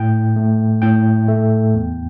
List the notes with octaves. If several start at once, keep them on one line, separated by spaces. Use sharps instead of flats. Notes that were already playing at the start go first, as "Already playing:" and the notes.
Already playing: A2 G5
A3
A2 G5
A3
E2